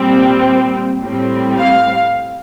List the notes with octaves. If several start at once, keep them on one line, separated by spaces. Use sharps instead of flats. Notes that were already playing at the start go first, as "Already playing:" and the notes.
Already playing: A#2 G3 C4
A2 G3 C4
F5